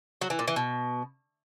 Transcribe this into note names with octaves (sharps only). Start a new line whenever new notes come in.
F#3
E3
A#2
E3
B2